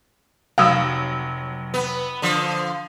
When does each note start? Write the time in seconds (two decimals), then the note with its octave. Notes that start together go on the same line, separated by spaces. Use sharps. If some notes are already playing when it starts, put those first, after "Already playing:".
0.58 F1 F#3 F5 D#6 E6
1.74 B3
2.22 D3 F3